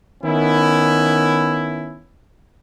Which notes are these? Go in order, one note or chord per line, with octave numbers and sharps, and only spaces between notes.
D#3 B3 C#4 E4